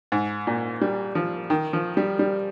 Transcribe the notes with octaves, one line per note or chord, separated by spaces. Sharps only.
G#2
A#2
G3
F3
D#3
F3
G3
G3